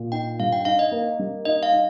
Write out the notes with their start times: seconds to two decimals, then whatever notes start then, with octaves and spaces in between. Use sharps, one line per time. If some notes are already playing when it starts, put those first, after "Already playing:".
Already playing: A#2
0.12 D#4 G5
0.40 G2 F5
0.53 G5
0.65 D#4 F5
0.79 D#5
0.92 A#3
1.19 G3
1.45 D#4 D#5
1.63 F5
1.72 D#4